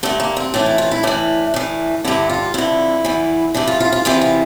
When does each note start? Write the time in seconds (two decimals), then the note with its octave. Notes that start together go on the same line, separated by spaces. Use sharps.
0.03 G2 D3 A3
0.20 A#3
0.37 C4
0.54 A2 E3 D4
0.66 E4
0.78 F4
0.91 E4
1.03 A2 E3 D4
1.54 A2 E3
2.05 G2 D3 E4
2.29 F4
2.54 F2 D3 E4
3.05 E2 E3
3.54 G2 E3 D4
3.68 F4
3.80 F4
3.92 F4
4.05 E2 C3 E3 F4
4.21 F4